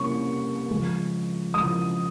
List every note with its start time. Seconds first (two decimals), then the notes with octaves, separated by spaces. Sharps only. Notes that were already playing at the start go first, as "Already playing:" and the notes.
Already playing: C3 G3 A#3 C#4 C#6
0.71 C#3 F3 G#3
1.54 C#3 F3 G#3 D#6